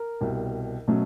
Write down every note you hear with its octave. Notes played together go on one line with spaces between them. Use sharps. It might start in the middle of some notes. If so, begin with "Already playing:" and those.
Already playing: A#4
C2 B2 G3
B2 F#3 A3 C#4